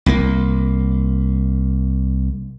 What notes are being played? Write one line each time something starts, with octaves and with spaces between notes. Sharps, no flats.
C2 A#3